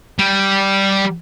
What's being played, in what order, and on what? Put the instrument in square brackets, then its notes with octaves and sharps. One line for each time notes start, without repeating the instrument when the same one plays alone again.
[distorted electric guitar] G3